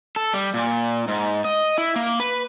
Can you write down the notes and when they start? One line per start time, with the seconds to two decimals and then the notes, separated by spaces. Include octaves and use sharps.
0.16 A4
0.33 G3
0.54 A#2
1.08 G#2
1.45 D#5
1.78 E4
1.96 A#3
2.20 B4